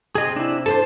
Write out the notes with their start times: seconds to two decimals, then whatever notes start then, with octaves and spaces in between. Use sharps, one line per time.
0.15 C3 G#4 D#5
0.36 D4 E4
0.66 A4 B4 C5 A5